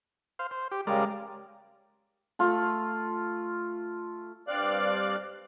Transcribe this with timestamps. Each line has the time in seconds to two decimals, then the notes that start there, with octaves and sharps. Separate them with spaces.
0.39 C5 F5
0.51 C5
0.72 G4
0.87 C#3 G3 G#3 A#4 D5
2.39 A3 F4
4.48 G2 C4 D5 F5 F#6